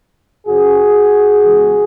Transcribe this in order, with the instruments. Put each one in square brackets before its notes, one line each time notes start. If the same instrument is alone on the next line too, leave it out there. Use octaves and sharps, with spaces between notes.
[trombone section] F#2 C#3 F3 F#4 G#4
E2 C#3 E3 G#3